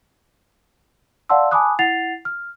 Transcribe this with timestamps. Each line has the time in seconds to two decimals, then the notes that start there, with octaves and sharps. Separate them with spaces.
1.29 D5 F5 F#5 A5 C6 E6
1.51 G#5 A5 B5 D6 D#6 F#6
1.79 E4 F#5 A6 C7 F7
2.25 F6